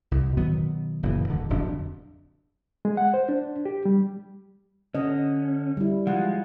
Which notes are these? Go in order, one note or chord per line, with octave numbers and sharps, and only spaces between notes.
C2
B2 D#3 F#3 B3
F#1 A#2 E3
D#1 D3 D#3
D1 F2 B2 D4
G#3
F#5
C5
D4
G4
G3
D3 C#4 D#5
G3 E4
F3 G#3 F4 F#5